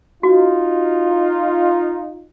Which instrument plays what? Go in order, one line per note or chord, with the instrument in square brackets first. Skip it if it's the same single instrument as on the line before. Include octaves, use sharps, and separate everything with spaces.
[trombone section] D#4 F4 [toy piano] F#4